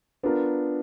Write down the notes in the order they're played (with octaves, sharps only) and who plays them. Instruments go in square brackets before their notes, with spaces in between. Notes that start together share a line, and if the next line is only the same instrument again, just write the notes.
[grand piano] B3 D4 F4 A#4